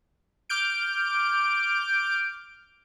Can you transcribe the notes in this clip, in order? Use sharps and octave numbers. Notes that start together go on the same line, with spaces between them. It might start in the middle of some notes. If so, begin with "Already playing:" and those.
D6 F6 G6 D7